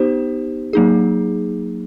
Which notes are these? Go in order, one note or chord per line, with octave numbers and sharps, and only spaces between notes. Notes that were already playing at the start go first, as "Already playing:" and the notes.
Already playing: B3 D#4 G4 C5
F#3 A#3 D#4 G#4